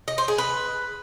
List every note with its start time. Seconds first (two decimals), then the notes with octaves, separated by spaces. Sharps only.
0.08 D#5
0.18 C5
0.28 G#4
0.38 B4